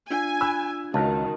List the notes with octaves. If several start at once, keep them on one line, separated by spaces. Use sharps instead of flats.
D4 F4 G#5
B5 E6 F#6
C#2 D#3 F#4 A5